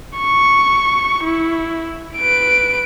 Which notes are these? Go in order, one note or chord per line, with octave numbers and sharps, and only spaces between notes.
C#6
E4
B4 D7